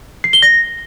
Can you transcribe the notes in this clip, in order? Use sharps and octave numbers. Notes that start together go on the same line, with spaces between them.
C7
G7
A#6